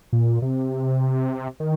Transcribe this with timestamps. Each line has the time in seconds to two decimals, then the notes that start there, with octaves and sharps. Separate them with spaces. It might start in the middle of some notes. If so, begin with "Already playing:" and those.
0.13 A#2
0.42 C3
1.60 D#3